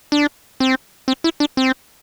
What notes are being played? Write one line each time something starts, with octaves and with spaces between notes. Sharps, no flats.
D4
C4
C4
E4
D4
C4